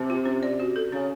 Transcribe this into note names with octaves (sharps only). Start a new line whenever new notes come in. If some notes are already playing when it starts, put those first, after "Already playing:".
Already playing: C3 C4
F4
C#4
D5
F#4
A4
C#3 C#4